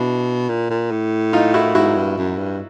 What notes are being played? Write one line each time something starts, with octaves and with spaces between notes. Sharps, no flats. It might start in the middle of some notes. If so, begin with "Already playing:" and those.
Already playing: B2 D4 E4
A#2
A#2
A2
D#4 F4
E4 F#4
G#2 E4 F#4
G2
F#2
G2